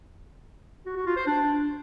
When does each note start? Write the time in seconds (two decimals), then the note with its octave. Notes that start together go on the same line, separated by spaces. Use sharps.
0.86 F#4
0.96 F#4
1.06 F4
1.17 C5
1.27 D4